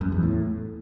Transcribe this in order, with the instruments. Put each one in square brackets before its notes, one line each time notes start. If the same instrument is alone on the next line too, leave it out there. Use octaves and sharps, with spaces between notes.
[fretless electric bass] F#2
E2
A2